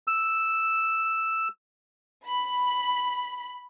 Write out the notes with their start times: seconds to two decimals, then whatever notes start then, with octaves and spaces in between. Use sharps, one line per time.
0.07 E6
2.26 B5